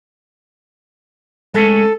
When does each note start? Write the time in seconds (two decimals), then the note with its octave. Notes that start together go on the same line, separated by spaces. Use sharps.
1.54 G#3 A3 C#4 A4